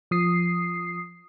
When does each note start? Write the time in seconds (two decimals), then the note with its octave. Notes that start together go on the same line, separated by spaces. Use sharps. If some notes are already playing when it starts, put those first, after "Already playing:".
0.11 F3 D#6 C7